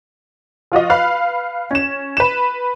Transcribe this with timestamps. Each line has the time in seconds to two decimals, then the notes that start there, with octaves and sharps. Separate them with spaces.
0.72 F3 F4 F#4 D#5
0.89 B4 F5 B5 F#6
1.71 C#4 E7
2.17 B4 E7